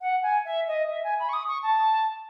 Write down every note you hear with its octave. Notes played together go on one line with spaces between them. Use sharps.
F#5
G#5
E5
D#5
E5
G#5
B5
C#6
D#6
C#6
A5